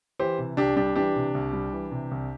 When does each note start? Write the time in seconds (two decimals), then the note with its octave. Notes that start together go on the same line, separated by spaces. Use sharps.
0.19 E3 G4 C5
0.38 C3
0.57 C2 D4 G4
0.77 G3 D4 G4
0.95 E3 D4 G4
1.16 C3
1.35 C2
1.53 G3
1.73 E3
1.91 C3
2.11 C2